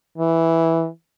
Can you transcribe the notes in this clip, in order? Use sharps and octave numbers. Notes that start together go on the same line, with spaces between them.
E3